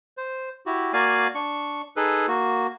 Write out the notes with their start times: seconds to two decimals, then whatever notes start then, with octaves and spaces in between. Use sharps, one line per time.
0.17 C5
0.66 E4 F#4 G4
0.93 A#3 F#4 D5 F5 G#5
1.35 D4 C#6
1.96 D#4 G#4 A4 B4
2.28 A#3 F#4